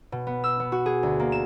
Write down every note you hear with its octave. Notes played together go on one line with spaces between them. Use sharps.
B2
B3
E6
B3
F#4
G#4
D2
A#3
E7